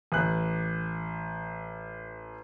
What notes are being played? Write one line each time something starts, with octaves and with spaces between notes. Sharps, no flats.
A1 F#6